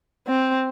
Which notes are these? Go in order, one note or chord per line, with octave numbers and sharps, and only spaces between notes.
C4